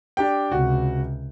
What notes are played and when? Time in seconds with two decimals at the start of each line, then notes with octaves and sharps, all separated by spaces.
0.17 D4 G4 G5
0.52 C#2 C3 F#4